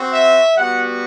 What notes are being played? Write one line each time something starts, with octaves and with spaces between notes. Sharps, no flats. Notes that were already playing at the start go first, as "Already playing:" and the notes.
Already playing: C4 F#4
E5
G3 B3 F#4 F#5